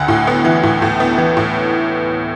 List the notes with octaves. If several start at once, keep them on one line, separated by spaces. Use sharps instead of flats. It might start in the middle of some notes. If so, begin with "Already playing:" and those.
Already playing: D2 F#5
A2
B3
E3
A2
A2
B3
E3
A2